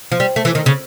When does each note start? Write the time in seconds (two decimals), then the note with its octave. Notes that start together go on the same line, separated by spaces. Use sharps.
0.12 F3
0.20 G3
0.36 A3
0.45 E3
0.55 D#3
0.66 C#3